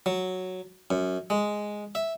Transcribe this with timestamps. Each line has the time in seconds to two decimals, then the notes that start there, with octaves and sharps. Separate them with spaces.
0.06 F#3
0.91 F#2
1.30 G#3
1.95 E5